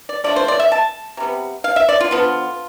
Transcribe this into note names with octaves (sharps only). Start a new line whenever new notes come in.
D5
D3 F3 A3 D5
C5
D5
E5
A5
C3 G3 B3
F5
E5
D5
F4
D3 F3 B3 F4